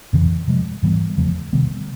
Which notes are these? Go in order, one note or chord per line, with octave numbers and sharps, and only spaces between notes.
F2 C#3 E3
C3 F3 G#3
G#2 E3 G3 B3
E2 C#3 F3 A3
C3 D#3 G3 B3